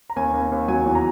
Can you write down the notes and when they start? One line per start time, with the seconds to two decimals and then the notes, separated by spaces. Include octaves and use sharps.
0.10 A#5
0.16 D#2 G#5
0.34 D#2
0.52 D#2
0.68 F#3 G#5
0.86 E2
0.95 A#5